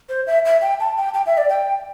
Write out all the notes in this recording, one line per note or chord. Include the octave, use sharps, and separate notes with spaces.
C5
E5
E5
G5
A5
G5
G5
E5
D5
G5